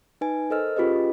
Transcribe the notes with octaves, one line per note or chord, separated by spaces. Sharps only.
D#4 B4 G#5
A4 A#4 C5 D#5 E6 F6
C#4 F4 G4 G#4 B4 D#5